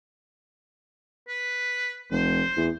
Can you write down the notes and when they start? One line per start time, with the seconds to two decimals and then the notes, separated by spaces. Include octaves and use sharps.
1.28 B4
2.11 F1 C5
2.57 E2